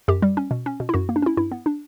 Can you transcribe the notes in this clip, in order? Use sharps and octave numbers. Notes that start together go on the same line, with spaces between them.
F#2 G4
G3
C#4
B2
C#4
B2
E4
F#2 F#4
A#3
D4
C#4 E4
G2 E4
B3
D4